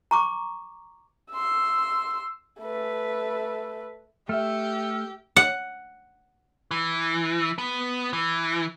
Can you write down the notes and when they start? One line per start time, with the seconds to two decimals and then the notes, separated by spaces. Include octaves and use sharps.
0.11 A#5 C#6 D6
1.32 C6 E6
2.60 A3 B4
4.29 A3 G4 E5 E6 F6
5.36 F#5
6.71 E3
7.58 B3
8.13 E3